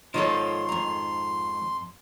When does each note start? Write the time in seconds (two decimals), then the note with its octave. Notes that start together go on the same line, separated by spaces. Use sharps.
0.14 G#2 D#3 F3 A4 C#5 D#5 C6
0.69 F2 A#5